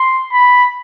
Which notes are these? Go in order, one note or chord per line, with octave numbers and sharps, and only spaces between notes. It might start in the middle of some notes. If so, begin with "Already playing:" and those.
Already playing: C6
B5